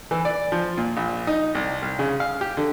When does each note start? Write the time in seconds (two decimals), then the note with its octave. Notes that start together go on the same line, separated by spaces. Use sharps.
0.11 E3
0.25 D5
0.52 F3
0.78 A#2
0.97 A#1
1.27 D#4
1.55 C2
1.82 C2
1.99 C#3
2.20 F5
2.41 G4
2.57 D3